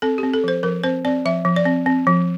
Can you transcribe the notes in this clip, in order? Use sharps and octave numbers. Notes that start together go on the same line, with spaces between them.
C4 A4
G4
C4
A4
F3 C5
F3 A#4
C4 C5
C4 D5
F3 E5
F3
D5
C4
C4
F3